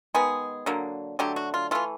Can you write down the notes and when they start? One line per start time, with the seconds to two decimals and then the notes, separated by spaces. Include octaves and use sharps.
0.14 D#3 G#3 B3 G#4
0.66 D3 F#3 A#3
1.19 D3 F#3 A3 G4
1.36 F#4
1.54 F4
1.71 E3 A3 F4